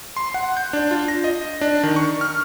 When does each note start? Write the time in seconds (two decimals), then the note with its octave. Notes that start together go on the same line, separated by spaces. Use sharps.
0.17 C6
0.34 F#5
0.57 G6
0.73 D4
0.91 F4
1.08 A#6
1.24 D#5
1.61 D4
1.83 D#3
1.96 C#6
2.21 F6